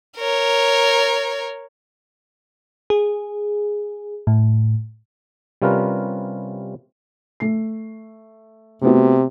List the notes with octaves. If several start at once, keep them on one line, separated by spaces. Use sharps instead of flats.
A#4 C#5
G#4
A2
C3 G3 C#4 F4 A#4 B4
A3 C7
C3 A3 B3 F#4